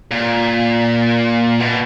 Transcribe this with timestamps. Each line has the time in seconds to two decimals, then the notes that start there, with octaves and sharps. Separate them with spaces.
0.11 A#2
1.60 B2